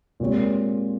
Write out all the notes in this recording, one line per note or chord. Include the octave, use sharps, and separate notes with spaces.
A#2 G#3 C4 G4 C#5